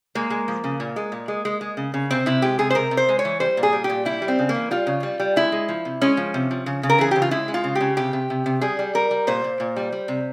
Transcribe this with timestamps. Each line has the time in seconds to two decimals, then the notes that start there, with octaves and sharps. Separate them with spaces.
0.15 G#3 A#3
0.30 G#3
0.48 F3
0.64 C#3
0.80 A#2
0.96 G#3
1.12 A#2
1.28 G#3
1.45 G#3
1.61 G#3
1.77 C#3
1.94 C#3
2.10 C3 C4
2.26 C3 E4
2.42 G#3 G4
2.59 C3 G#4
2.70 C5
2.75 C3 A#4
2.91 C3
2.97 C5
3.09 G#3
3.19 C#5
3.25 E3
3.40 G3 C5
3.57 A#2
3.63 G#4
3.73 G3
3.84 G4
3.90 A#2
4.05 G3 E4
4.22 G3
4.28 C4
4.39 C#3
4.49 A#3
4.54 E3
4.71 G3 F4
4.87 C#3
5.03 G3
5.20 G3
5.36 G#3 E4
5.52 G#3
5.68 F3
5.85 C3
6.01 G#3 C#4
6.17 F3
6.34 C3
6.51 F3
6.66 C#3
6.83 C#3
6.90 A#4
6.99 E3 G#4
7.11 C#3 G4
7.22 F4
7.31 G#3 E4
7.48 G#3
7.54 F4
7.64 C#3
7.75 G4
7.81 C#3
7.97 C3 G4
8.13 C3
8.30 C3
8.46 C3
8.61 G3 G#4
8.79 G3
8.95 G3 A#4
9.11 G3
9.27 A#2 C5
9.44 A#2
9.60 A#2
9.76 G3
9.92 G3
10.08 C3